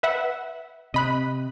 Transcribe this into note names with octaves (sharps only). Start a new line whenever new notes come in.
B4 E5 F#5
C3 D#5 B5 F#6